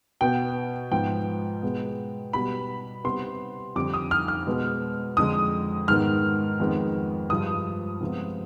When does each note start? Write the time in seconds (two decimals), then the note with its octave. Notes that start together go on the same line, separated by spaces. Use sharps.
0.21 B2 B3 G5
0.91 G#2 F3 B3 G5
1.63 B2 G#3 B3
2.33 B2 G3 B3 B5
3.04 C3 G3 B3 C6
3.75 F2 D3 G3 D6
3.93 D#6
4.11 F6
4.28 F6
4.47 B2 G#3 B3
5.17 F2 D3 G#3 D#6
5.88 G#2 D#3 G#3 B3 F6
6.60 F2 D#3 G#3 B3
7.30 G2 F3 G#3 D#6
8.01 C3 F3 G#3 B3